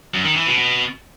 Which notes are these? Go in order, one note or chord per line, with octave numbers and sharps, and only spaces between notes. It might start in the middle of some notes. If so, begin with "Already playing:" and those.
F#2
D#3
E3
B2
B2